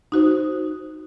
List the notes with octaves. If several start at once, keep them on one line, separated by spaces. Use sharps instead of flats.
D#4 F#4 C5